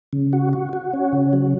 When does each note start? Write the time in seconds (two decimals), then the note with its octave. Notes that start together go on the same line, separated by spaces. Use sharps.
0.13 C#3
0.33 F#4
0.53 F#4
0.73 F#4
0.93 C#4
1.13 C#3
1.33 F#3